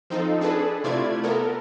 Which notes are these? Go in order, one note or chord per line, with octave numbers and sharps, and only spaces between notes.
F3 C4 D#4 A4
D4 G#4 A4 B4
C3 A3 E4 F4 D5 G#6
B3 A4 A#4